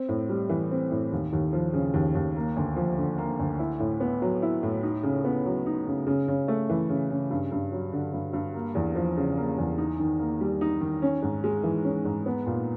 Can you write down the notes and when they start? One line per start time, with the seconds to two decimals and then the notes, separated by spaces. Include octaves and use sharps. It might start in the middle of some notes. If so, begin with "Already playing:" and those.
Already playing: C4
0.08 A2
0.29 G3
0.49 E3
0.71 C4
0.91 A2
1.12 D#2
1.33 D#2
1.53 F3
1.73 C#3
1.94 D#2
2.15 D#2
2.36 A#3
2.56 D2
2.76 F3
2.98 D3
3.18 A#3
3.39 D2
3.59 E4
3.80 A2
4.00 B3
4.22 F#3
4.42 E4
4.63 A2
4.83 D#4
5.03 C#3
5.24 B3
5.45 F#3
5.66 D#4
5.87 C#3
6.07 C#3
6.28 C#3
6.48 A3
6.69 E3
6.89 C#3
7.10 C#3
7.30 G2
7.52 G2
7.72 F#3
7.93 D3
8.13 G2
8.33 G2
8.54 A#3
8.75 E2
8.95 F3
9.17 C#3
9.37 A#3
9.58 E2
9.78 D#4
9.99 D#3
10.19 A#3
10.41 G3
10.61 D#4
10.81 D#3
11.02 C#4
11.22 G#2
11.44 G#3
11.63 E3
11.85 C#4
12.05 G#2
12.26 B3
12.46 A#2